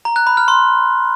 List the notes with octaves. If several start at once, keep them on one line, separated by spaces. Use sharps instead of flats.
A#5
F#6
B5
F6
C6